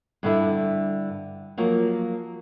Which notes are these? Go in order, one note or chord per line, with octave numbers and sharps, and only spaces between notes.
G2 D3 E4
F3 F#3 A#3